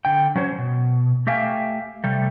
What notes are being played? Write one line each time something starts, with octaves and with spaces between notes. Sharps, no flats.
D3 G5
F#3 C#4 C5 C#5
B2
A3 G4 E5 F5 G5 G#5
C3 G3 A3